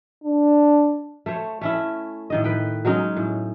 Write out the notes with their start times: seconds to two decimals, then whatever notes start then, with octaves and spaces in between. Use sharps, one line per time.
0.24 D4
1.26 A3 C5 C#5
1.61 A3 C#4 E4
2.30 A2 D#3 D#5
2.44 B4 G5
2.85 F#3 G#3 C#4 D#4
3.17 A2